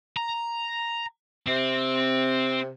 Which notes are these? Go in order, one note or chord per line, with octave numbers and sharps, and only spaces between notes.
A#5
C3 C4